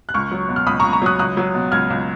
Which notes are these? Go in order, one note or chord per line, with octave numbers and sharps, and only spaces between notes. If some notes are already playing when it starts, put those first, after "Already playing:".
F#6
C#2 C#6 F6
F#3
B2
F6
C#2 B5 D#6
C#2 A#5 C#6
A#5 C#6
F#3 D#6 F#6
C#2 D#6 F#6
F#3
B2
C#2 F6 G#6
C#2